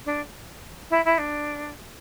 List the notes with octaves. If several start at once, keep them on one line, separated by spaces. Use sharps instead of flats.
D4
E4
E4
D4